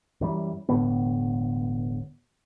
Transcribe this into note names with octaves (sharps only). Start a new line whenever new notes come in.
F#2 E3 G3
E1 A2 D3 B3